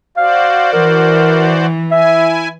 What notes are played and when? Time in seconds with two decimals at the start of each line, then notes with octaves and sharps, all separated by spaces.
0.17 F#4 C5 D5 F5
0.73 E3 A#4
1.91 E4 E5 G#5